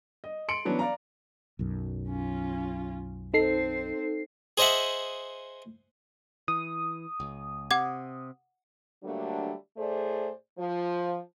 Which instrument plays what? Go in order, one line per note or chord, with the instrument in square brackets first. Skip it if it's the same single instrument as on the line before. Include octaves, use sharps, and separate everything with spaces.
[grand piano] D#5
C6 C#7 D7 F#7
E3 F#3 B3 C#4 D4
D5 F5 A#5
[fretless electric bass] B1 F#2
[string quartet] C#4 F4
[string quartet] C4 C5 [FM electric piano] D#4 A4 C7
[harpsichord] G#4 C5 D#5 E5 F#5
[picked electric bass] E3 [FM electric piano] D#6
[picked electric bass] C#2
[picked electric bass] C3 [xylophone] F#5 D6 G#6
[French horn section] D3 F#3 G3 A3 A#3 D4
A2 A3 G#4 C5 D5
F3